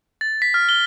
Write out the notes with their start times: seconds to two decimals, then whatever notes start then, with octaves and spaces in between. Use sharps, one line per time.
0.21 A6
0.42 B6
0.54 F6
0.69 G7